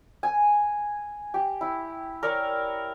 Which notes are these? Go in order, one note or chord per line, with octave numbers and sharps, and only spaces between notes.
G#5
G4
E4
A#4 C#5 D5